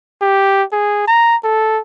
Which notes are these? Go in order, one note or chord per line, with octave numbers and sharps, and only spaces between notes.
G4
G#4
A#5
A4